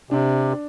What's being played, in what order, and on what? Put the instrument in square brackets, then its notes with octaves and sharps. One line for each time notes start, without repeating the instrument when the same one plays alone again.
[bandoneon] C3 [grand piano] D4